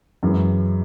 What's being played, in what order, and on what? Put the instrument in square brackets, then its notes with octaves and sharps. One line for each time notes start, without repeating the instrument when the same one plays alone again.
[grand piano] F#2 E3 G#3